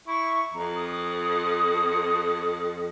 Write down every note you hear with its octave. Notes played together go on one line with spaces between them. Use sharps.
E4 C#6
F2 A#5
D#6